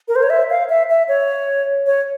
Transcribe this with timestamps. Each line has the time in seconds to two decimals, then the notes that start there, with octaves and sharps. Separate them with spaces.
0.08 A#4
0.16 C5
0.23 C#5
0.30 E5
0.50 F5
0.69 E5
0.89 E5
1.08 C#5
1.86 C#5